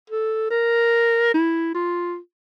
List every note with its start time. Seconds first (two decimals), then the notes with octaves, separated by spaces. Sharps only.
0.10 A4
0.50 A#4
1.34 E4
1.74 F4